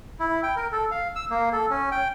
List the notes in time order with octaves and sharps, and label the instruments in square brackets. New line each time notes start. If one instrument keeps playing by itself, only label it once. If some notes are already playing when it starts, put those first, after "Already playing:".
[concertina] E4
G5
A#4
A4
F5
E6
A#3
A4
C#4
G5